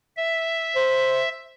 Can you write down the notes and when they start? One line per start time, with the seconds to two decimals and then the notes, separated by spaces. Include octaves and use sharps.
0.17 E5
0.76 C5